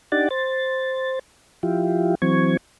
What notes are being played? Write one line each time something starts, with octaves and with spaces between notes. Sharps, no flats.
D4 D#4 G4 D5 F#5 A6
C5 A6
F3 E4 F4 G4
E3 F#3 C4 C#6 G#6